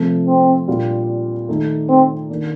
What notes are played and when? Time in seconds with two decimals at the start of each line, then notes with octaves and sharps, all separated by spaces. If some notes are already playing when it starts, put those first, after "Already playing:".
Already playing: C3 F3 A3
0.27 C4
0.68 A#2 G3 D4 F4
1.49 D#3 A3 D#4
1.89 C4
2.30 D#3 A#3 D4